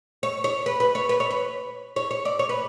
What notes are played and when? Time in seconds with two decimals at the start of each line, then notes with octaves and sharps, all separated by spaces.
0.23 C#5
0.44 C#5
0.66 B4
0.80 B4
0.95 C#5
1.09 B4
1.20 C#5
1.31 B4
1.96 C#5
2.11 C#5
2.25 D5
2.39 C#5
2.49 B4